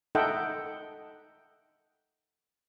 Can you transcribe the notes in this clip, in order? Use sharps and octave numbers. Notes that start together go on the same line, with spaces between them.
D#4 A4 D#5 E5 F#5 G5